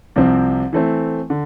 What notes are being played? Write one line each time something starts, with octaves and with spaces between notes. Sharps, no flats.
C2 C3 F3 C4
E3 A3 C4
D3